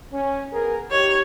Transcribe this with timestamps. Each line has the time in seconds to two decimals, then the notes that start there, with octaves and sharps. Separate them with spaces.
0.11 C#4
0.52 B3 G#4 A#4
0.91 D#4 G4 C#5